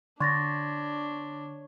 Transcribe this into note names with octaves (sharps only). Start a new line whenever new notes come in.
D3 D4 C#5 C6 A6 A#6